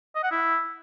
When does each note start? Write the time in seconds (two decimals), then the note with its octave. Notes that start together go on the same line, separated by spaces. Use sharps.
0.15 D#5
0.23 F#5
0.31 E4